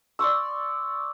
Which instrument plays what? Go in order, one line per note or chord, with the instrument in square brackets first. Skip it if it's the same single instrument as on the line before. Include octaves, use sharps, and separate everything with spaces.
[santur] D5 C6 C#6 E6